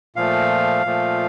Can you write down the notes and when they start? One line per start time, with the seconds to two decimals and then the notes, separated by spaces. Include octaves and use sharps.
0.16 A#2 F3 A3 F5
0.85 A#2 F3 A3